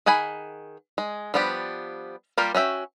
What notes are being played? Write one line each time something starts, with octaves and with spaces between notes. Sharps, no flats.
D#3 G#4 F#5 G#5 B5
G#3
F3 G3 B3 D4 G4
G3 A#3 F4 G4 A#4
C#4 F#4 E5 G5